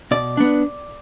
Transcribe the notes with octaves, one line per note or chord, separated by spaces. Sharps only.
B2 D5
B3 D4